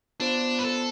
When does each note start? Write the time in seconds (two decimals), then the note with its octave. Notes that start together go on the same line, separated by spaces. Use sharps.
0.20 B3 D4 F4 C5
0.59 B4
0.65 A4